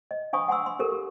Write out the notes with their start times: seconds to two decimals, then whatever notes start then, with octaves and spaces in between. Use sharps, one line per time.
0.11 D#5
0.33 D4 F5 G#5 B5 C#6 D#6
0.48 F#5 G#5 B5 C6 E6
0.66 C6
0.79 G4 A4 A#4
0.92 G4